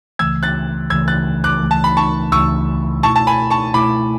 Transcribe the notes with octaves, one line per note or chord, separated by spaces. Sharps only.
C#2 C#3 E3 A3 E6 G#6
F#6 A6
C#2 C#3 E3 A3 E6 G#6
F#6 A6
D6 F#6
C#2 C#3 E3 A3
A5
B5
A5 C#6
C#2 C#3 E3 A3 C#6 E6
B2 A3 E4 A5 C#6
A5
G#5 B5
A5 C#6
B2 A3 E4 B5 D6